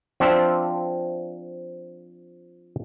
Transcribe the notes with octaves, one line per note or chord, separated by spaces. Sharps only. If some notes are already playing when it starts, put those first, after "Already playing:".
F3 C4 D4 F4 E5